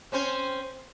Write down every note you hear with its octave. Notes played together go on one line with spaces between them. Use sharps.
C4 C#4 C5